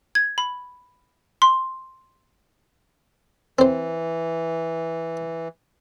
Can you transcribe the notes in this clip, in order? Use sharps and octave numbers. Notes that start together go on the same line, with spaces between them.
G#6
B5
C6
E3 C4 C5